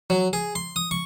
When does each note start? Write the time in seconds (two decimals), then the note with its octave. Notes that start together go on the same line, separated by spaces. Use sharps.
0.10 F#3
0.33 G#4
0.55 C6
0.76 D#6
0.91 C#6